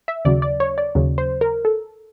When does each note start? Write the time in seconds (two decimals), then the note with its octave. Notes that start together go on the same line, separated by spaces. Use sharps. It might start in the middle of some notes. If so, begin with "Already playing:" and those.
0.08 E5
0.25 D#2 C#3 F#3 D5
0.42 D5
0.60 C#5
0.78 D5
0.95 D#2 C#3 F#3
1.18 C5
1.41 A#4
1.65 A4